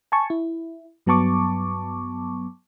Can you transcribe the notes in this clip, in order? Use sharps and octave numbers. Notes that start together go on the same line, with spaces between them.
G#5 A5 C#6
E4
G2 F#3 B3 A5 C#6 D6